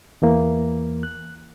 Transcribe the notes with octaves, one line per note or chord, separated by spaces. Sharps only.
E2 E3 A#3
F#6